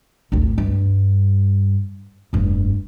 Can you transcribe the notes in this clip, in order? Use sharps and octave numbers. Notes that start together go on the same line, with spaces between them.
G#1 D2
G2
F1 G2